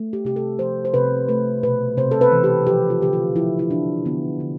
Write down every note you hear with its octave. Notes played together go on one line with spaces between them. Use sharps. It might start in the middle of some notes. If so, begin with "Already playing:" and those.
Already playing: A3
G4
C3 G4
A4
F3 C5
C5
C3 B4
A3 B4
B2 B4
C3 C5
A4
B4
E3
G4
F3 G4
F4
D3 G4
F4
F3 E4
E4
F3 D4
D3 B3
D3